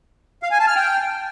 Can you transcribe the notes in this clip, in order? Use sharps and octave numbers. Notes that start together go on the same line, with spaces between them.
F5
G#5
A5
F6
G5